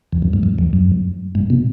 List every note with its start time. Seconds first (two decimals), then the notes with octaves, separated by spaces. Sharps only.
0.12 E2
0.22 F#2
0.33 G#2
0.43 F#2
0.58 E2
0.73 F#2
1.35 G#2
1.50 B2